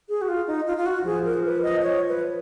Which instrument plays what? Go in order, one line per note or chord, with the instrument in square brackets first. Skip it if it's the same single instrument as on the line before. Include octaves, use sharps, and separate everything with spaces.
[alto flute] G#4
F#4
F4
D#4
F4
F4
F#4
[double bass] F3 [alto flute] G#4
[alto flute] A#4
B4
D#5
C#5
B4